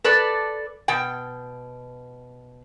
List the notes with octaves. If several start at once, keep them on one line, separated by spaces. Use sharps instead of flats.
A4 B4 D5
B2 G5